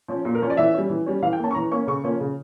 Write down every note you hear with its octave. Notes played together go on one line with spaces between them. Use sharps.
F3 C#4
A#2
A#4
F3 C#4 C#5
D5
E3 E5
G3 C#4
E3
G3 C#4
E3 F5
G5
A#3 C#4 A5
C#6
E3 A#5
A#3 C#4 C#6
C#3 C#6
F3 A#3 C#4
C#3